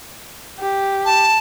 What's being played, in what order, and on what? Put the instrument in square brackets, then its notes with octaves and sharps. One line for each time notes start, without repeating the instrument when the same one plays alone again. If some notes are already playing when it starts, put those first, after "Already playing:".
[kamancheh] G4
[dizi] A5